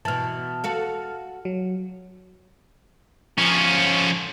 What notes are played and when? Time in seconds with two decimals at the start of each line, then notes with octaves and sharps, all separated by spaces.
0.05 B2 E3 A5 F6
0.64 F#4 A4 F5
1.45 F#3
3.38 F3 C#4